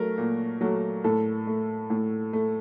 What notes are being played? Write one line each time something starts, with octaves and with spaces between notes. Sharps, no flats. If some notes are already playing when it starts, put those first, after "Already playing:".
Already playing: F#3 A3 A#4
A#2
F#3 A3
A2 A4
A3
A2
A3